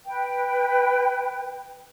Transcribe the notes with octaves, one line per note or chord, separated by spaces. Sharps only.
B4 G5